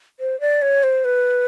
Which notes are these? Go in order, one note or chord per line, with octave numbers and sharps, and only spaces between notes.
C5
D5
C#5
C5
B4